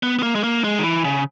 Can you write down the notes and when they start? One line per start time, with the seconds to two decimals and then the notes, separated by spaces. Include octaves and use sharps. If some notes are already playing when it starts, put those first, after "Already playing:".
0.03 B3
0.19 B3
0.23 A#3
0.35 G#3
0.44 A#3
0.64 G#3
0.79 D#3
0.84 E3
1.05 C#3